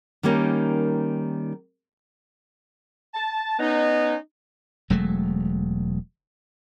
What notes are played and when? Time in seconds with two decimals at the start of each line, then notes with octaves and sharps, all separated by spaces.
0.23 D#3 G3 A#3 C#4 D#4
3.14 A5
3.59 B3 C#4 D#4
4.90 E1 F#3 G#3 A3